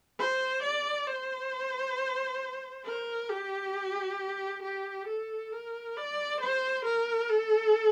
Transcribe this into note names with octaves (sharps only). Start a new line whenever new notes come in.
C5
D5
C5
A#4
G4
G4
A4
A#4
D5
C5
A#4
A4